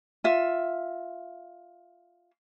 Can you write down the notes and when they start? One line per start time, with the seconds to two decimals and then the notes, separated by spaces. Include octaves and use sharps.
0.24 F4 E5